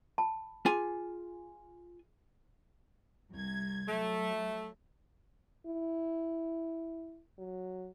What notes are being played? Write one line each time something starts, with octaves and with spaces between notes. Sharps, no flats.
A5 B5
F4 G#4 G#5
C2 G#6
F#3 A3
E4
F#3